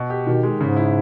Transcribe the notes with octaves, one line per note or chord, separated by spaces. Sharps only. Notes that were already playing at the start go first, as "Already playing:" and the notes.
Already playing: B2
G4
B2 D#3
G#3
G#2 C#3
E4